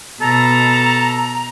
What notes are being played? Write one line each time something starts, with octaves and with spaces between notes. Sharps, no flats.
B2 A4 A#5